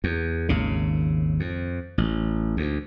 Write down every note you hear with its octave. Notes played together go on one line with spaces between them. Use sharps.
E2
G#1 D#2 C#3
F2
A1
D2